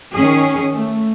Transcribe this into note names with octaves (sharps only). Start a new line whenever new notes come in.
D#3 C#4 G#4
A3